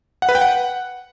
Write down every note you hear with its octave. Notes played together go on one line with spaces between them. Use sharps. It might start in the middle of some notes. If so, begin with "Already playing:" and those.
F#5
B4
G5
F#5